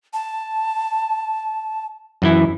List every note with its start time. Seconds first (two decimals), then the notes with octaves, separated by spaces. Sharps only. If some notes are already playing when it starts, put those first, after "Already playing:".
0.14 A5
2.22 F#2 E3 E4